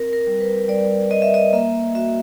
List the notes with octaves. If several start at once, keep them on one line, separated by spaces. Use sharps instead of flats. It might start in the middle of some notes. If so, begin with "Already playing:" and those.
Already playing: C4 A#4
A#4
G3
B4
G3 D5
G3 D#5
E5
D#5
A#3 E5
F#4 E5